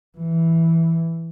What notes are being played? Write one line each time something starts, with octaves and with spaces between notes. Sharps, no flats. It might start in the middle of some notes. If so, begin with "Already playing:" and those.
E3